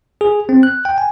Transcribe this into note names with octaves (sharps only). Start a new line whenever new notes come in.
G#4
C4
F#6
G5
G#5